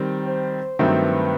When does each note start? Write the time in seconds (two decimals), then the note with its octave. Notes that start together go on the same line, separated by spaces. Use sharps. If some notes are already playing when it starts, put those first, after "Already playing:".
Already playing: D#3 G3 C4
0.26 C5
0.79 G2 D#3 F#3 A3 C4 B4